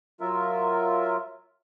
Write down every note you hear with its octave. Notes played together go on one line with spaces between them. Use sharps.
F#3 F4 A#4 E5